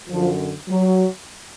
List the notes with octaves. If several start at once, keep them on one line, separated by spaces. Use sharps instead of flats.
F#2 D3 F3
F#3